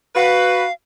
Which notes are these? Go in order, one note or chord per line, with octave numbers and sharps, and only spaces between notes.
F#4 B4 F5